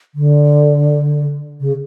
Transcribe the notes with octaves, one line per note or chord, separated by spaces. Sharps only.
D3
C#3